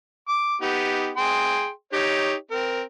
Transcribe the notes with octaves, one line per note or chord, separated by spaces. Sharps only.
D6
B3 D#4 G4
G#4 G5 C6
D#4 G4 C#5
C4 A#4